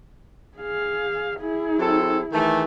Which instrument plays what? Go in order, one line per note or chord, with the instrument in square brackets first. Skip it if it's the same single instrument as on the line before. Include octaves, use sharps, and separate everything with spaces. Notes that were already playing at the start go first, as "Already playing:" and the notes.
[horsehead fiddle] G#4 F5
E4 G#4
[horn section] F#3 C4 A4
[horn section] D#3 E3 A3 [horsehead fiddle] G#4